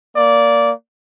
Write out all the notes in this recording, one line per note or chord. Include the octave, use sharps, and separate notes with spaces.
A#3 D5